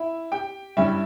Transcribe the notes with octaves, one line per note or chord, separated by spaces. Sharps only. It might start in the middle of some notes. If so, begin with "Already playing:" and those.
Already playing: E4 E5
G4 G5
G2 G3 C#4 E4 E5